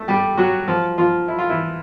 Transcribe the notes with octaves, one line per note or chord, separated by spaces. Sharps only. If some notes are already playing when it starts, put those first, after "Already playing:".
Already playing: A3 A4
G3 G4
F#3 F#4
F3 F4
F3 F4
E4
F4
E3 E4